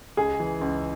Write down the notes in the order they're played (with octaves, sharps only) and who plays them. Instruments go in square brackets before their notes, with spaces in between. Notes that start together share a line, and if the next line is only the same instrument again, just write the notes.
[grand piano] C#2 [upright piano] G#4
[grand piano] E3
C#2